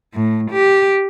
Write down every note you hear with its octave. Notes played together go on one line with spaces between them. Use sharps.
A2
G4